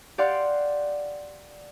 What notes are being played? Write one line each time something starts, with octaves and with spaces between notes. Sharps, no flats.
G4 D5 F5 F#5 C6